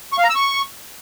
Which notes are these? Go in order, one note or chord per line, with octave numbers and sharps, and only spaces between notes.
C#6
F5
A#5
E6
C#6